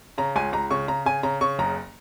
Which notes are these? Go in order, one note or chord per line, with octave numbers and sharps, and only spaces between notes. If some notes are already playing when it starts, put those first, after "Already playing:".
C#3 A#5
C#2 G#5
C#2 A#5
C#3 C#6
C#3 A#5
C#3 G#5
C#3 A#5
C#3 C#6
F#1 A#5